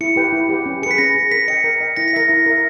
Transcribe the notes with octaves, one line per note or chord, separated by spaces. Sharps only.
E4 C#7
G4 B4 G5
E4
G4 B4 G5
C#4
G#4 B4 B6 C#7
C#4 A#6
G#4 B4
A#4 B6
D#5 G5 C#7
A#4
D#5 G5
E4 A#6
B6
A#4 E5 A#6
E4
A#4 E5